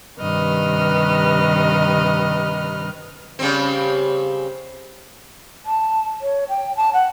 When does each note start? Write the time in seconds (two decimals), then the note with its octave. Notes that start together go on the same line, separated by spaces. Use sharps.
0.19 G2 C3 D#3 B4 D#5 F6
3.39 C#3 G3 C4
5.66 A5
6.21 C#5
6.49 G5
6.77 A5
6.93 F#5